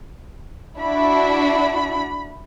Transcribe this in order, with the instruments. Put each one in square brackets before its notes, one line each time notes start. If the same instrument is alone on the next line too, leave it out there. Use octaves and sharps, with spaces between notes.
[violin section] D4 E4 F#4 [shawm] B5